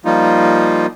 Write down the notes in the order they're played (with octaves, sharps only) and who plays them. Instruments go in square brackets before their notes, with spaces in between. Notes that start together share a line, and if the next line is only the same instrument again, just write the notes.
[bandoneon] F3 G3 A#3 D#4 F4